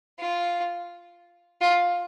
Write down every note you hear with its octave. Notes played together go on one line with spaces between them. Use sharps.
F4
F4